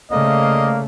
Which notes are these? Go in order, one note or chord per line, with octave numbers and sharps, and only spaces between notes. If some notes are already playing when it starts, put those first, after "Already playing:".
C#3 A3 A#3 D5 D#5 F5